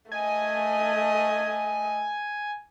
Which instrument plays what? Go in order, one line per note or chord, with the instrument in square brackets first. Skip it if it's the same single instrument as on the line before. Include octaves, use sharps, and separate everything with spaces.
[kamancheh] A3 D#5 [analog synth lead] G#5